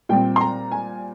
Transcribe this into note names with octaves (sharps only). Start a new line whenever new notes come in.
A#2 G3 C4 G5
C6
A#5
G#5